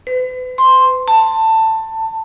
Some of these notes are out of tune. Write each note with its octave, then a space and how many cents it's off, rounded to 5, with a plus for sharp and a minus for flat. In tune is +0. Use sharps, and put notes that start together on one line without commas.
B4 +45
C6 +5
A5 +15